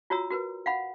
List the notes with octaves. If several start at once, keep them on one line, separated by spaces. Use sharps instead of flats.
F4 F#4 C#5 A#5 E6
F#4 A#4 B4
F5 F#5 B5